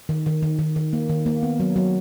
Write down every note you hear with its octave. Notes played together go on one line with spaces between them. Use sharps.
D#3
D#3
D#3
D#3
D#3
A#3
D#3
A#3
B3
F#3
F#3